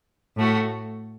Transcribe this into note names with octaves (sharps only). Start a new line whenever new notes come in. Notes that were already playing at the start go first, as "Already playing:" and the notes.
A2 A3 F#4